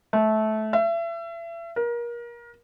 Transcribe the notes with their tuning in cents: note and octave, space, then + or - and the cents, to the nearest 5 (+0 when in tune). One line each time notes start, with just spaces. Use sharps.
A3 -20
E5 +35
A#4 +30